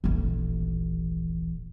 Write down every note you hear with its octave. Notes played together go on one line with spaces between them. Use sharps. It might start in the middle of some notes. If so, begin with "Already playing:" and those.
D#1 A1